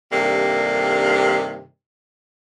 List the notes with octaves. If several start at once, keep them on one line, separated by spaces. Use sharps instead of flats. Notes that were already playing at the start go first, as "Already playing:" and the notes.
G2 C3 D#3 A#3 D4 A4